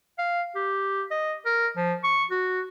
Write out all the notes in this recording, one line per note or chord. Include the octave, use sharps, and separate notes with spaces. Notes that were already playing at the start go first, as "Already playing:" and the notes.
F5
G4
D#5
A#4
F3
C#6
F#4